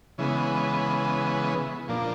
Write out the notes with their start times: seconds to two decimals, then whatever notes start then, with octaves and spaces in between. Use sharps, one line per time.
0.18 C#3 E3 G#3 B3
1.88 A#2 F3 A#3 D4